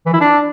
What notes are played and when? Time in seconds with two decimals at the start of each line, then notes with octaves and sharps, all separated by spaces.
0.06 E3
0.14 E4
0.21 D4